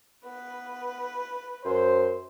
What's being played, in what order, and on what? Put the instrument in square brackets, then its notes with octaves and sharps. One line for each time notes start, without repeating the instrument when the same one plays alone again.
[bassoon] B3 [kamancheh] B4
[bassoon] F#2 [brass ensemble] C5